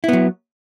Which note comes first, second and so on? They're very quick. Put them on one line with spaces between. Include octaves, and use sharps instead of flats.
E4 B3 F#3